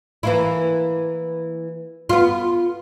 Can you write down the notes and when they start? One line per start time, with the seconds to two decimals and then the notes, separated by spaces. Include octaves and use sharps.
0.23 E3 A#3 E4
2.09 B3 F4